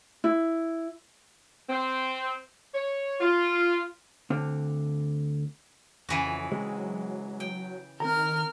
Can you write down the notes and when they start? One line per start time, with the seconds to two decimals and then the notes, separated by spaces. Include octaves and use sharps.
0.24 E4
1.70 C4
2.74 C#5
3.20 F4
4.30 D2 D3 C4 D4 F5
6.09 F2 C#3 E3 F#4
6.52 F#3 G#3 C4
7.40 G5
8.00 D#3 C4 A#4 A#5 F6